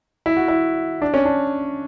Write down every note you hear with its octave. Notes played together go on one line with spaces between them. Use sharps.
E4
F#4
E4
D4
C#4
D4